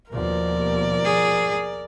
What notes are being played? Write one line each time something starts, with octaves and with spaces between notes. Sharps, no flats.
D#2 B2 F3 A#4 D5
G#4